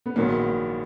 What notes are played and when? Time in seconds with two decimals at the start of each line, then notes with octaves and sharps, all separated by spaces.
0.06 B3
0.16 A#1 G#2 D#3 F#3 A#3 B3